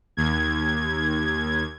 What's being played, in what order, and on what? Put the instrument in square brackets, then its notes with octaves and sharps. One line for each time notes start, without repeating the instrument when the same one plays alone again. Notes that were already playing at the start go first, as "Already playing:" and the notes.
[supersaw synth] D#2 G#6